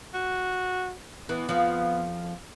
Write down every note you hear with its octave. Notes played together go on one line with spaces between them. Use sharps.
F#4
E3 B3
F2 F3